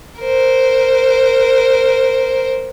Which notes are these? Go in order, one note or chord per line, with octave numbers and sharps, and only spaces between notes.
A#4 C5